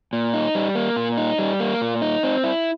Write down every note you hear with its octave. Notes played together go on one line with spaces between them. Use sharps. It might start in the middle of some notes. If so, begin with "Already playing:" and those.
A#2
D#4
G3
A#3
A#2
D#4
G3
A#3
A#2
D#4
C4
E4